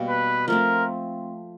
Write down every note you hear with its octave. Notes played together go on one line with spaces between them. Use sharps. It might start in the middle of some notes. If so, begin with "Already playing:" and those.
Already playing: B2 G3 A#3
B4
F3 A3 C4 A#4